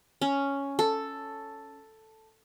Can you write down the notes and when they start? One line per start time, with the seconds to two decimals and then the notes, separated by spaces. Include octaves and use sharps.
0.21 C#4
0.79 A4